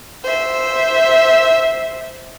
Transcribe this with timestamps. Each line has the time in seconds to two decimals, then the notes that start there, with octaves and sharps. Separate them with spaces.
0.24 C5 E5